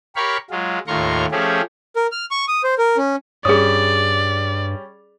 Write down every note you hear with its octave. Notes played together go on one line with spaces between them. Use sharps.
G4 A#4 C#5 F5 B5 C#6
F#3 G#3 F4
D#2 A2 F4 A#5 C6 C#6
F3 A3 C#4 G4 G#4
A#4
F6
C#6
D#6
C5
A#4
C#4
G2 G3 C#4 G#4 D5 D#6